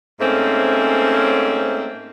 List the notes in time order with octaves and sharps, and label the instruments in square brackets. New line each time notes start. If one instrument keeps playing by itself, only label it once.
[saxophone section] G#2 A3 A#3 C4 C#4